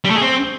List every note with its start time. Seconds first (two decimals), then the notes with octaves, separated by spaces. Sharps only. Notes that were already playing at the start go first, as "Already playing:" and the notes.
0.05 G3
0.10 A3
0.16 G#4
0.21 C4